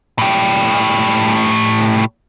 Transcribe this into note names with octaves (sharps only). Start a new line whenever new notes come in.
A2 G4